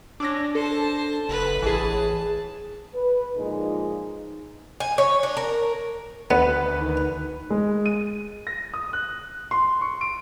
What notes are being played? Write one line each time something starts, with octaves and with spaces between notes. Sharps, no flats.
C#4 D4 D6 E6 A#6
A4 C5 A5
F#1 B4
A1 E3 G#4 A5
B4
A#2 F3 G#3 D#4
G#5
C#5
D4
A#4
D2 B3 B4
D#3
G#3
D#7
A#6
D#6
F#6
C6
C#6
D7